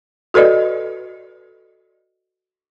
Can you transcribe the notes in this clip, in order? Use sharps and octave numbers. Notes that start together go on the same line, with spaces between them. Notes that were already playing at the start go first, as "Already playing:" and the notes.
F#4 A4 B4 D5 D#5